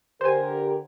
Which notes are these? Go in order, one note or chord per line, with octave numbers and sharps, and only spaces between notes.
D3 G4 A#4 C5 G#5